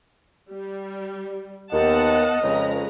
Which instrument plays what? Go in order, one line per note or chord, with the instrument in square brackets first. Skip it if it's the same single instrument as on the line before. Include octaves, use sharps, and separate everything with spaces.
[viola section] G3
[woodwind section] D#2 [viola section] B3 F#5 A5 [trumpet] D#5
[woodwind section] F2 C#3 [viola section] G#3 B4 A#5